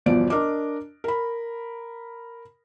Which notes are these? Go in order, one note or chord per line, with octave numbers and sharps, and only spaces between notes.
G1 E2 B2 F3 D5 D7
D4 A#4 D#5 D6
A#4 B5